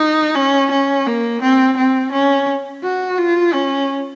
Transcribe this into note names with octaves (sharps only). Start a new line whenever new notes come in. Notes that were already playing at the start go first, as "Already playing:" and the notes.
Already playing: D#4
C#4
C#4
A#3
C4
C4
C#4
F#4
F4
C#4